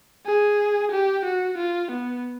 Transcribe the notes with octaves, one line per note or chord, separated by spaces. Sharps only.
G#4
G4
F#4
F4
B3